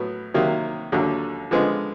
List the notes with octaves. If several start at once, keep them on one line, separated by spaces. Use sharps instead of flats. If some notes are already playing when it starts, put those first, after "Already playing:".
Already playing: A2 F#3 B3
C3 D#3 F#3 A#3
D#2 D3 F#3
D3 F3 G#3 B3